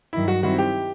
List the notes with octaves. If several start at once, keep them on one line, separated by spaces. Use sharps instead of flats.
G2 D#3 F#3 E4
F#4
D#3 G3 C4 E4 F#4
G4